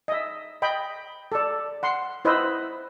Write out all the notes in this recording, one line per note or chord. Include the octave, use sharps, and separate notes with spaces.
D#5 E5
D#5 G5 B5
A4 D5
F#5 C6
E4 B4 C5 D#5 E5